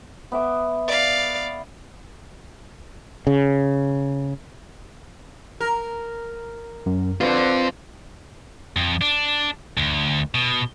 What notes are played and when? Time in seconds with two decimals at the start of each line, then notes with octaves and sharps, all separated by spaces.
0.32 B3 E5 D6
0.88 D5 F5
3.27 C#3
5.60 A#4
6.86 F#2
7.21 D3 C4 F4 B4
8.77 F2
9.01 D4
9.77 D2
10.34 B2